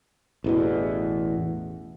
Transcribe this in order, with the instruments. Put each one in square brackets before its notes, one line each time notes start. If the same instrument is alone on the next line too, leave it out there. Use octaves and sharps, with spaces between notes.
[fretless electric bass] A1 E2 B2